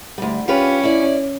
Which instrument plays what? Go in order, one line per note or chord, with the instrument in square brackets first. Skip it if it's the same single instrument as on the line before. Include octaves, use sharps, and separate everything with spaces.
[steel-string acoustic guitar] D2 G3
[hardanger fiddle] C#4 [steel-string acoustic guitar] F4 G4 B4
[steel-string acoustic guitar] E4 D5